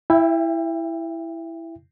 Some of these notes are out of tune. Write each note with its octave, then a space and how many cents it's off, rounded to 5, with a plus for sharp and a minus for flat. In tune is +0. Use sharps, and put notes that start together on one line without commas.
E4 +0 E5 +30 G5 +25